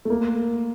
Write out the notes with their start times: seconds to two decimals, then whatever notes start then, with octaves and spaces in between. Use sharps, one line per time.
0.05 A3
0.10 A#3